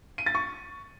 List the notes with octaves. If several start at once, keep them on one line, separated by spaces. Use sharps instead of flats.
D#7
A6
C#6